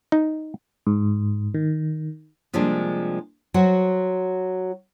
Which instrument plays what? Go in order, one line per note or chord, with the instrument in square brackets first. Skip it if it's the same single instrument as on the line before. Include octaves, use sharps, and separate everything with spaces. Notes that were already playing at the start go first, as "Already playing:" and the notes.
[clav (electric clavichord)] D#4
[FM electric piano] G#2
D#3
[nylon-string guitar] C3 F3 G3 G#3 A#3 D4
F#3 F#4 C5